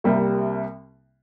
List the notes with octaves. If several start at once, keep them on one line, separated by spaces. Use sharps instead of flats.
C2 C3 G3 A#3